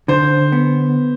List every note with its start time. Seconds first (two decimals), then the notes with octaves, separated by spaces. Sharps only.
0.08 D3 C5
0.52 B3